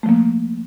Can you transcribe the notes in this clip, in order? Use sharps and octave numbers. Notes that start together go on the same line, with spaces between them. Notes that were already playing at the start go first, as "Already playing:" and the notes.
F3 A3 A#3